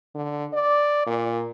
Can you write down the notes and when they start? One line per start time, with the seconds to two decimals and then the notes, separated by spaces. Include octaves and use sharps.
0.14 D3
0.53 D5
1.06 A#2